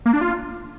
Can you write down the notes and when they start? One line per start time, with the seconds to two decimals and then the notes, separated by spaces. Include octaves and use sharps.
0.06 A#3
0.13 D4
0.21 F4